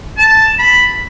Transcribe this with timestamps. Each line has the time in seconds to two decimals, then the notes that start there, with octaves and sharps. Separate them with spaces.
0.18 A5
0.59 B5